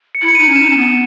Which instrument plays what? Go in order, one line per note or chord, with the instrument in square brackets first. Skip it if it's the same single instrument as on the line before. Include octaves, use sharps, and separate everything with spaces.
[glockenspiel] C#7
[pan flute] E4
[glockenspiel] C#7
[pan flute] D#4 [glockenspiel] D#7
[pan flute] C#4
[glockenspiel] E7
[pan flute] D#4
C#4
B3